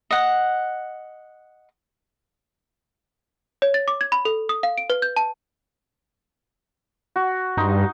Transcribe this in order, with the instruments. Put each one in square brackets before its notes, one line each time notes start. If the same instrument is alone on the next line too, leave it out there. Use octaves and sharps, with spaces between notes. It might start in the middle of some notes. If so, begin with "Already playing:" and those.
[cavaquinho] D#5 F#5
[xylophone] C#5
A6
D6
G#6
B5
A4
D#6
F5
D7
B4
G6
A5
[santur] F#4
[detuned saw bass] G2 [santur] D#4 C6